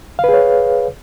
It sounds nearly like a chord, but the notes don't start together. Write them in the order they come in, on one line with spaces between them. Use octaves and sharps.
F5 B4 G#4 C#5